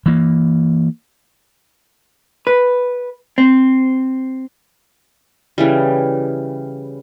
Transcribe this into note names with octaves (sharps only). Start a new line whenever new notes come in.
E3 A#3
B4
C4
C#3 E3 G3